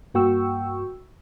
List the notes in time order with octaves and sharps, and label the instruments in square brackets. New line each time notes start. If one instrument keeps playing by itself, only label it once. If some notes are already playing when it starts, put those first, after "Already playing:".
[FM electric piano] G2 A#3 F#4 G5 C#6 E6